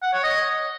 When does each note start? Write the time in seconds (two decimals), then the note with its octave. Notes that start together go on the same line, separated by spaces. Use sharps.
0.02 F#5
0.13 C#5
0.23 D#5